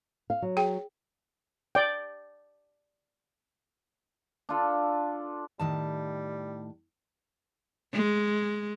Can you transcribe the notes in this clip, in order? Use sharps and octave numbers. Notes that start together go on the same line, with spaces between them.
F5
F#3
G#4 G5
D5 G5
D4 F4 A4
A2 D#3 G3 A5
G#3